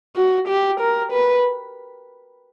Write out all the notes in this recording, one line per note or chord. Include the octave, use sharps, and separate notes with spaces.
F#4
G4
A#4
B4